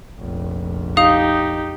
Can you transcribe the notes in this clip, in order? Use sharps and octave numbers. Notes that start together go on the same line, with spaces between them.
F1 A#1
D#4 G4 F5 D#6 F7